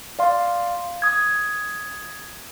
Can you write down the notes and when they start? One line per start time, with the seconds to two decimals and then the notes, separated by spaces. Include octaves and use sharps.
0.19 D5 F5 C6
1.02 D#6 G#6